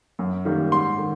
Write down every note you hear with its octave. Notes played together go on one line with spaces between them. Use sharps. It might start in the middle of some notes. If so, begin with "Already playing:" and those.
F#2
D#3 G3 A#3
G#2 C6
D#3